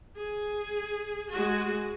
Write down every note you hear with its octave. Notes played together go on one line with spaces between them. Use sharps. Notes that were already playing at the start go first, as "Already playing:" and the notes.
G#4
G#3 F#4